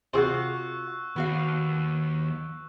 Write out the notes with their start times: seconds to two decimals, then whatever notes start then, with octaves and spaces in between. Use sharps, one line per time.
0.14 C3 F4 F#4 G#4 C5 C#6 E6 F#6
1.16 D#2 B3 F#4 F5